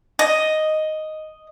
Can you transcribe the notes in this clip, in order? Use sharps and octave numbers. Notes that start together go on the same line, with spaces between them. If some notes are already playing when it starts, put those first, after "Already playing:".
D#5